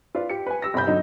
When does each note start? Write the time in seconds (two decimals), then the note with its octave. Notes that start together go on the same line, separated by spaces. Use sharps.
0.15 F4 B4 D5 F5
0.30 G4 C#7
0.46 B4 G#5
0.62 G4 E6 A#6
0.74 G1 C3 B5 G6
0.87 D3 F#3 D#4